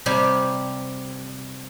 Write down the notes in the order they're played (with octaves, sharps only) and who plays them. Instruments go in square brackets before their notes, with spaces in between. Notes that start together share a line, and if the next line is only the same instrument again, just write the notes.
[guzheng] C3 G3 G4 C5 D5 G#5